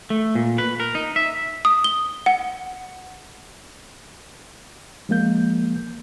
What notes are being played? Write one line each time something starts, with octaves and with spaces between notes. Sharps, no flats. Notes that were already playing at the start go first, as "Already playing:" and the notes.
A3
A#2
B4
A#4
D#4
E5
D#6
G7
F#5
F3 G#3 A#3 G6